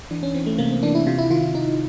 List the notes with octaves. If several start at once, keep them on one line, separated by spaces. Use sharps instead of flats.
E3 D4
C#4
E3 C4
A3
C3 A#3
C4
E3 D4
E4
C3 F4
E4
D#3 F4
E4
D#3 D#4